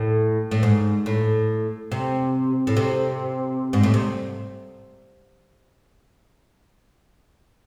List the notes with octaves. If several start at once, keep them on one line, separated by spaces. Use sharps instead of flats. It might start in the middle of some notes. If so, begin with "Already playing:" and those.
Already playing: A2
A2
G#2
A2
C3
A2
C3
G#2
A2
C3